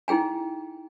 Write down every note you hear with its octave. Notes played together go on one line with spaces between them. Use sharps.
D#4 E4 G#4 G5 G#5